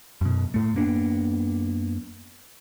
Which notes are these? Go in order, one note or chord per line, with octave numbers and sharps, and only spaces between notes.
F#2 B2
A2 A3
F#2 A#3 B3 D4